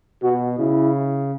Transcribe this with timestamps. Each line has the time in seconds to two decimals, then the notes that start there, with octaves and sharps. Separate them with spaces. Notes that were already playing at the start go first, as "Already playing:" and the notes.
0.23 B2 F#4
0.59 C#3 E4